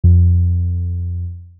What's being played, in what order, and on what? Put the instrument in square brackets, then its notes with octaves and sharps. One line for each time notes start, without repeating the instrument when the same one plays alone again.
[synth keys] F2